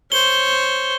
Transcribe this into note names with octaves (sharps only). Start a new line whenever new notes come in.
C5 C#5 G7